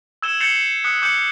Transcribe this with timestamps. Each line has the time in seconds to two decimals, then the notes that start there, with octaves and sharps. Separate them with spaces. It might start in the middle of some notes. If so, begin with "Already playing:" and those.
0.22 E6 G#6 E7 G7
0.40 G6 A6 C7 C#7 F7 G7
0.84 D#6 F#6 B6 C#7
1.02 D6 G6 C#7 F#7